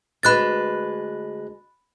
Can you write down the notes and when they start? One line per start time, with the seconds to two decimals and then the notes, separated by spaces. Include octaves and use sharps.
0.23 D2 G#3 B4 B5 F#6 A6